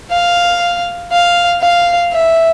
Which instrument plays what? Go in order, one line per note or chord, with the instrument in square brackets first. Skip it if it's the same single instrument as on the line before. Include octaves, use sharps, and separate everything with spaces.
[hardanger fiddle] F5
F5
F5
E5